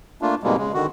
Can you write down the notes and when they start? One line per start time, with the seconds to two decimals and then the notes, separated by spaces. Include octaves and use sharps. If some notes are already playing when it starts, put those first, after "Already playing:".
0.22 A3 A#3 D4 F4
0.43 F2 G#2 B2 G3 G#3 A#3
0.58 C#3 G#3
0.74 D3 D#3 F#4